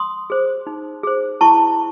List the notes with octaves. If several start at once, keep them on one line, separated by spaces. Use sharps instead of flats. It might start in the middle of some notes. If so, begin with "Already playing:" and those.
Already playing: C6 D#6
G#4 C5
D#4
G#4 C5
E4 A5 C#6